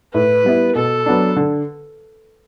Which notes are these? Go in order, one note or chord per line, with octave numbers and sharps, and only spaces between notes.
A2 B4
G3 B3 E4
B2 A4
F#3 B3 D4
D3